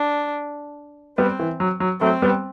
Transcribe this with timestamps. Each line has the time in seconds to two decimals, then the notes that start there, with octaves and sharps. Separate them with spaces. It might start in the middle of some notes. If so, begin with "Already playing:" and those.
Already playing: D4
1.18 G3 B3 C4
1.40 E3
1.60 F#3
1.80 F#3
2.01 F#3 A3 C4
2.22 G3 B3